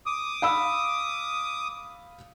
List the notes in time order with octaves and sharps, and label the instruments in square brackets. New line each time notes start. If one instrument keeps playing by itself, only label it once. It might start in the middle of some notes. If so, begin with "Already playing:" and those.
[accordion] D6 D#6
[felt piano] F5 B5 E6